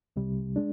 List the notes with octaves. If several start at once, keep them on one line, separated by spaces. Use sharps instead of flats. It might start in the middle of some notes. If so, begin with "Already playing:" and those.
C2 C3 G3
G#3 D4